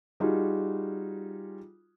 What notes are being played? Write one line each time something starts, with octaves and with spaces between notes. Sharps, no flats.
G3 D#4 F4 F#4 G#4